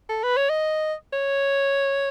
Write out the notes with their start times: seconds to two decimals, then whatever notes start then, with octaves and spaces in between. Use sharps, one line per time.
0.09 A4
0.23 B4
0.37 C#5
0.49 D#5
1.13 C#5